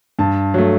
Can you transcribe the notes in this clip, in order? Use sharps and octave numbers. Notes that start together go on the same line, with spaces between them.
G2 A5
F#3 A3